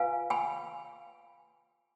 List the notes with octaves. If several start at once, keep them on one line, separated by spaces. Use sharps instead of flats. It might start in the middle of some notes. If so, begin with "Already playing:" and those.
Already playing: F4 B4 F5 G#5
G#5 B5